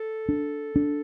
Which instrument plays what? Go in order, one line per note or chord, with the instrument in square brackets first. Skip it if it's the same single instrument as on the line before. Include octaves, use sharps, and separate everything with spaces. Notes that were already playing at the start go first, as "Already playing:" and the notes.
Already playing: [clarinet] A4
[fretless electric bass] D4
D4